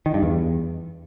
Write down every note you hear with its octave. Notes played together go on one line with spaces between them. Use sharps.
D#3
G2
E2